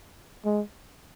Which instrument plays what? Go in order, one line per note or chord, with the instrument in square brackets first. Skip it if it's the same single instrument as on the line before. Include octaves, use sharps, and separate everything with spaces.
[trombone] G#3